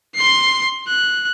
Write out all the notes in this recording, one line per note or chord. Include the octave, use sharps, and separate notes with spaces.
C6 C7
F#6